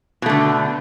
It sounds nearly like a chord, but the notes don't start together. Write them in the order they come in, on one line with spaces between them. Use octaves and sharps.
B2 A3 D3